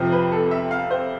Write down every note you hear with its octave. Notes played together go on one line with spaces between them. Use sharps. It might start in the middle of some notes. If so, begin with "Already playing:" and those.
Already playing: F2 C3 F3 C5
B4
A4
E5
F5
C5